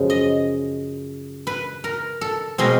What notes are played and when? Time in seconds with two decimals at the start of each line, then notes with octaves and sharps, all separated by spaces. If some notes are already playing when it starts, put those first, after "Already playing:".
Already playing: F#2 C#3 F3 G#3
0.10 D#5
1.47 B4
1.84 A#4
2.21 A4
2.58 B2 G#3 C4 A#4